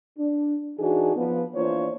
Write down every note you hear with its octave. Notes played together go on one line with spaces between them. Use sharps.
D4
E3 D4 D#4 F#4 G#4
F3 B3
E3 A#3 D4 F4 C5 C#5